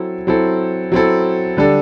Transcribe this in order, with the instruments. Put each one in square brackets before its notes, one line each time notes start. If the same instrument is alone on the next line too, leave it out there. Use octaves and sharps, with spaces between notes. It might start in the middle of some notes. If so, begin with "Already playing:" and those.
Already playing: [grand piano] F#3 C4 E4 A4
F#3 C4 E4 A4
F#3 C4 E4 A4
D3 G3 D4 A4